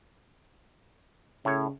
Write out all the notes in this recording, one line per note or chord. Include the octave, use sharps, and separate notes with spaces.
A2 C#3 C#5